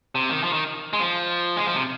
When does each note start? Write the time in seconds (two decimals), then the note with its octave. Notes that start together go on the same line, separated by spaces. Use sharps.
0.15 C3
0.30 D#3
0.44 F3
0.53 D#3
0.93 G#3
1.00 F3
1.56 G#3
1.66 F3
1.75 C3